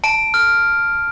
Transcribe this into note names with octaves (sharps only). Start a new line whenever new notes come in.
A5 D7
F6